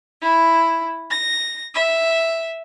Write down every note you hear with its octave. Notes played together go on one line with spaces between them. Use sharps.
E4
A#6
E5